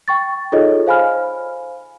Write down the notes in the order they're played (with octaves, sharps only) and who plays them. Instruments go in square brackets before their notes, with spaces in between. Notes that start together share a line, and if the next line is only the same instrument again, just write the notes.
[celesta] G5 C#6 A6
D#4 F4 G#4 A4 C#5 D#5
C5 F5 G#5 B5 F6